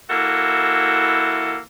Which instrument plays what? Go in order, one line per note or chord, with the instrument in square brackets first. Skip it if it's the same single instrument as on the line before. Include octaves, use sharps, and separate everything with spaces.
[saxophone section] E3 A#3 E4 F#4 A4